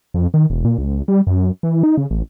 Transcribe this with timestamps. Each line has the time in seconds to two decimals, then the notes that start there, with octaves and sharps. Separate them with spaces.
0.14 F2
0.34 D#3
0.50 E1
0.65 A#2
0.78 C#2
1.08 G3
1.27 F#2
1.63 E3
1.83 D#4
1.97 C#3
2.10 A1